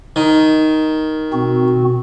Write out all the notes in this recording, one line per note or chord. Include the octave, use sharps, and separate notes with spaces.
D#3
B2 C4 F#4